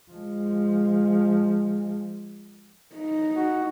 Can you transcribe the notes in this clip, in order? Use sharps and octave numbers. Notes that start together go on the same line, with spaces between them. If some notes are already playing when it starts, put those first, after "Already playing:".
F3 G#3
D#4
F#4